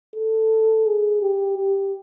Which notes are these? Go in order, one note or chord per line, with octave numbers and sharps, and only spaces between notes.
A4
G#4
G4
G4